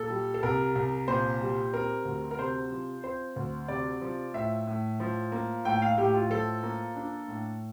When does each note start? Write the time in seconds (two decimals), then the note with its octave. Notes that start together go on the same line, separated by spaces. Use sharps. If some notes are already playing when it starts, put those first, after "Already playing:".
Already playing: A#2 A4
0.10 G3
0.34 A4
0.43 C2 A#4
0.75 C2
1.08 A#2 C5
1.40 G3
1.73 C4 A#4
2.05 D2
2.31 A#4
2.38 C3 C5
2.71 F3
3.04 C4 C5
3.36 D2
3.68 C3 D5
4.02 F3
4.34 A2 E5
4.67 A2
5.00 F3
5.32 A#3
5.65 A2 G5
5.82 F5
5.97 A2 G4
6.14 F4
6.30 F3 A4
6.63 A#3
6.96 D4
7.28 A2